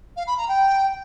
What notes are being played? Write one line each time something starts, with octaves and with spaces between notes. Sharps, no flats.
F5
B5
A#5
G5